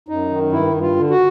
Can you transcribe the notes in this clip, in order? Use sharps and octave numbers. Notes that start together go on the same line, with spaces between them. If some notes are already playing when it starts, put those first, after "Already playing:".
F#2 D#4
D#3
G2 E4
G2
F4
D3
F#4